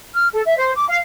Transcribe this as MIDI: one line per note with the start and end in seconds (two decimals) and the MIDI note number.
0.14 0.27 89
0.33 0.41 69
0.46 0.56 76
0.59 0.72 72
0.75 0.85 86
0.88 0.98 77